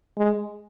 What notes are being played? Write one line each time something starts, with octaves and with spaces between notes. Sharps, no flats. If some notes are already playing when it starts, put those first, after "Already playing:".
G#3